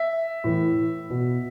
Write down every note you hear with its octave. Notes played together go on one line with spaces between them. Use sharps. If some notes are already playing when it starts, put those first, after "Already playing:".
Already playing: E5
A2 E3
B2